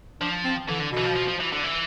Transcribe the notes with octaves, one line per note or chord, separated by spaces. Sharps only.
F3 D4
C4
D3 E3
D3
B2
E3
F3
F3
F3
E3
D3
E3